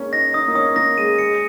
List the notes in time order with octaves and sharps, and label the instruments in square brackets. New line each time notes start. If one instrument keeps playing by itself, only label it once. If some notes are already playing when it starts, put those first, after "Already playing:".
Already playing: [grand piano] G#3 A#3 C#4
[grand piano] D#4 [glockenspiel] A#6
[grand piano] D#4 [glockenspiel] D#6
[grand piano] A#3
[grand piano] C#4 [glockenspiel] D#6
[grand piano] A#3 [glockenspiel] A#6
[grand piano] G#3 [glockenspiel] D#7
[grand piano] G#3 [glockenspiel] C#7